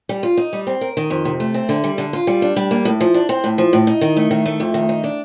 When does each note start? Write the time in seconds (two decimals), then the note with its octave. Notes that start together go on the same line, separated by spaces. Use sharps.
0.09 G3
0.23 F4
0.37 D#4
0.53 G3
0.67 C4
0.81 A#4
0.97 D#3
1.10 F2
1.25 C3
1.40 A3
1.54 C4
1.69 D3
1.84 G3
1.98 D3
2.13 F4
2.27 G3
2.42 D4
2.56 G3
2.71 A#3
2.85 A2
3.01 F3
3.14 D4
3.29 C4
3.44 A2
3.58 F3
3.73 A2
3.87 D#4
4.01 D#3
4.17 A3
4.31 D#3
4.46 A3
4.60 F2
4.74 D#3
4.89 D#4
5.04 D4